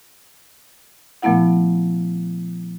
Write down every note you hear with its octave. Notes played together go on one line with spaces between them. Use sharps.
A#2 F3 A3 B3 E4 F#5